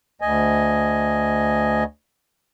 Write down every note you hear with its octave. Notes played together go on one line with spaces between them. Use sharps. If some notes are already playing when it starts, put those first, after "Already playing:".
D2 D#5 G#5